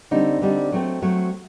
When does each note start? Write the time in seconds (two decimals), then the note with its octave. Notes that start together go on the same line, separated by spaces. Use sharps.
0.11 D3 G3 C4 D#4
0.42 D3 G3 C4 D#4
0.72 F#3 A3 C4
1.02 F#3 A3 C4